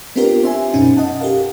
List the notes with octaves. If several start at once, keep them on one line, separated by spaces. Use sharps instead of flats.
B3 C4 D4 F4 G4 A#4
C5 E5 G#5
F#2 B2 C#4 D#4
D#5 F#5 A5
G4 A4 A#4 F5